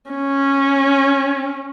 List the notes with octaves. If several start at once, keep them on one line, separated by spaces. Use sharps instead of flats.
C#4